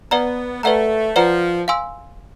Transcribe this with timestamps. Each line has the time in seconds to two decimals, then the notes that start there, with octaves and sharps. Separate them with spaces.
0.11 B3 B4 D5 F#5 A#5
0.63 A3 B4 D5 F#5 A#5
1.16 F3 B4 D5 F#5 A#5
1.68 F5 G#5 C6 E6